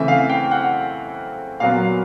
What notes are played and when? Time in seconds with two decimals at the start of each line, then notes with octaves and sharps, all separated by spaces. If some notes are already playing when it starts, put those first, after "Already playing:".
Already playing: C#3 E3 A3 C4 E5
0.08 F5
0.29 G5
0.51 F#5
1.60 A#2 F#3 B3 F5